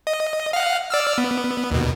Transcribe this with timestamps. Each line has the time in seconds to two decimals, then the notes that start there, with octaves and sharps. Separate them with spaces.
0.07 D#5
0.53 F5 F#5
0.90 D5 E6 F6
1.18 B3
1.71 D#2 B2